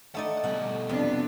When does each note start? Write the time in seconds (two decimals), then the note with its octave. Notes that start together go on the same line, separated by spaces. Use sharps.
0.15 A3 D#4 D5 F#5
0.44 B2 G3 F#5
0.89 F2 C3 B3 D4